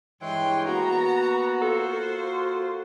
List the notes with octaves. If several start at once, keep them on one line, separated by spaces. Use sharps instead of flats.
G2 E3 G#3 C#5 G5 C6
A#3 B3 F#4 A#5
F4 A4 C5